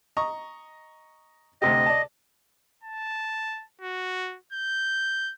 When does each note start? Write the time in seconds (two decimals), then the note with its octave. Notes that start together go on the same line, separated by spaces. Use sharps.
0.17 D#5 A#5 C#6
1.62 D2 C3 G4 D#5
1.86 D5 A5
2.83 A5
3.81 F#4
4.53 G6